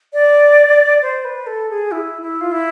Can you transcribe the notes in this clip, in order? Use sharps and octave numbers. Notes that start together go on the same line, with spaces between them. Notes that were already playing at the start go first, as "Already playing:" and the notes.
D5
C5
B4
A4
G#4
E4
E4
F4
E4